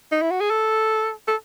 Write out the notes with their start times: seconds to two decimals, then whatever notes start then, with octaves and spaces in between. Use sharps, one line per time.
0.11 D#4
0.22 E4
0.31 F#4
0.40 G#4
0.50 A4
1.28 A4